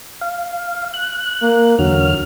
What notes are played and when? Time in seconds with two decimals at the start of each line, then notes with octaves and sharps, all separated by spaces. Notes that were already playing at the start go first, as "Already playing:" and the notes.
0.21 F5
0.94 F#6
1.42 A#3
1.79 E2 D3 F#3 F6